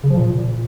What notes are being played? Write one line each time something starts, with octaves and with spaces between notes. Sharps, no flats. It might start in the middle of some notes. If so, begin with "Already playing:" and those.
C#3
F3
A#2